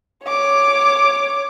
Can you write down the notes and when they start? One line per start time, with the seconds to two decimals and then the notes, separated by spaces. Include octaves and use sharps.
0.25 C#5 D6